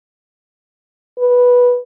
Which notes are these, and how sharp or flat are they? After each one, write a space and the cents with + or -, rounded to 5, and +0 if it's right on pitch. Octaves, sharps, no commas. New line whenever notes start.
B4 -10